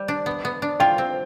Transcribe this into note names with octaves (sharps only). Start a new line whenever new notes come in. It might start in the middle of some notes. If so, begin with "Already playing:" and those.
Already playing: G3
D4
B3
B3
D4
F4 G5
C4